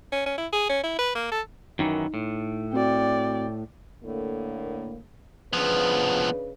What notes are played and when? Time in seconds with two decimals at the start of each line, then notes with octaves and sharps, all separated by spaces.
0.12 C#4
0.26 C#4
0.38 E4
0.52 G#4
0.69 C#4
0.84 E4
0.99 B4
1.15 A#3
1.32 A4
1.79 F#2 D#3 E3 D#4
2.14 A2
2.73 C4 F#4 D5 G5
4.03 A2 D3 A#3
5.53 C#3 F3 B3 D4 B4